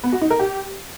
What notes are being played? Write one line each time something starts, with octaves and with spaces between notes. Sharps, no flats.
B3
F#4
D#4
A#4
G4